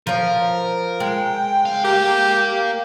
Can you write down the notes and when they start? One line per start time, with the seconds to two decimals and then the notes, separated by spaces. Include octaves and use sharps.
0.07 F3 A#4 C#5
1.00 G#3 G5
1.66 C#2 F5
1.84 G4 A#4 F5